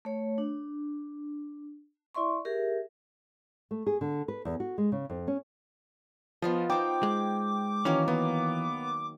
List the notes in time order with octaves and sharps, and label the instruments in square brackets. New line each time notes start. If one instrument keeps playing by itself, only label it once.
[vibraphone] A3 C#5
D4
E4 D5 E5 C6 C#6
G4 G#4 A#4 E5
[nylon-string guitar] A3
G#4
D3
B4
E2
F#4
G#3
C#3
F2
C#4
[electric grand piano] F3 [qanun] B3 F4 D#5
[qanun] D#4 C5 [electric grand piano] G5 [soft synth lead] D6
[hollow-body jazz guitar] G#3
[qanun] D#3 F#3 A#3 [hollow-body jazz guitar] E3 [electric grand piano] C#4
[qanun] A#3 [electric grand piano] B3